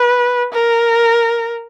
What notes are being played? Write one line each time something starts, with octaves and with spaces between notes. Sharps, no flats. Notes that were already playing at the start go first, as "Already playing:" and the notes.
Already playing: B4
A#4